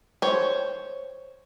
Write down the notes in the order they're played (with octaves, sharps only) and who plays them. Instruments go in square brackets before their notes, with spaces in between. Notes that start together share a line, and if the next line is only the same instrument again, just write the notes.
[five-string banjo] C5 C#5